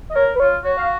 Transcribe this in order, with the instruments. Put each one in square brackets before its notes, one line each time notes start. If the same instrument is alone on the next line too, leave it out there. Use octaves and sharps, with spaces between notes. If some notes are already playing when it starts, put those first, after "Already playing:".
[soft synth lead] D#5
[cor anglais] A#4 [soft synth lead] C#5
[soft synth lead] B4
[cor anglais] F4 [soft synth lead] C#5
[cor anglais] F#4 [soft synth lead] C#5
[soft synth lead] F5